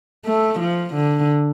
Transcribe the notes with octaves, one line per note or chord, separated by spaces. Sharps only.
A3
F3
D3